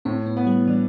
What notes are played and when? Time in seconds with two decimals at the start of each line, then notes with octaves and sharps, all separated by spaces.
0.05 A2 C4
0.26 B3
0.37 B3
0.47 G3
0.67 E3 D4